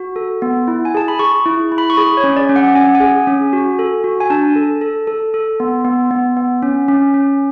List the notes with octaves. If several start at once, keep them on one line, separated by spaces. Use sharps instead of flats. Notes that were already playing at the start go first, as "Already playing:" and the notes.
Already playing: F#4
A4
B3
E4
G#5
G#4 A5
B5
G#4 C#6
E4
E4
B5
C#6
G#4 B5
C#5
C#4
D5
C#4
F#5
C#4 G#5
F#5
G#5
G#4
C#4
F#4
A4
F#4
G#5
D4 A5
A4
A4
A4
A4
B3
B3
B3
B3
C#4
C#4
C#4